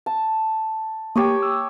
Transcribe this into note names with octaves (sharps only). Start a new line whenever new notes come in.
A5
A#3 G4 C#5 D#6
E6